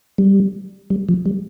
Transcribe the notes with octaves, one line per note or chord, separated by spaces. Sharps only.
G3
G3
F3
G3